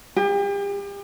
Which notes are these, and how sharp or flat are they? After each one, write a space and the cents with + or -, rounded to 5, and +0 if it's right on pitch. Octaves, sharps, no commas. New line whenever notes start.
G4 +40